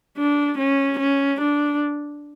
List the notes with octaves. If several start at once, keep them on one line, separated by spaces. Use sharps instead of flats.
D4
C#4
C#4
D4